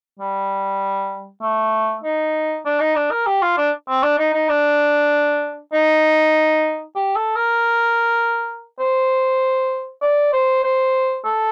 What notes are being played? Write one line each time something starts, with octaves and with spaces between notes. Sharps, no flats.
G3
A3
D#4
D4
D#4
D4
A#4
G4
F4
D4
C4
D4
D#4
D#4
D4
D#4
G4
A4
A#4
C5
D5
C5
C5
A4